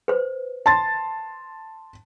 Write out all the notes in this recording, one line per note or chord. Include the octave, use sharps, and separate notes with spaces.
B4 C5
A5 C6 A6